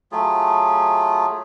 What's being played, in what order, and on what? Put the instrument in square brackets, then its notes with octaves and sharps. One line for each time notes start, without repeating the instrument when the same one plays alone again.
[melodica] F#3 A3 F4 G#4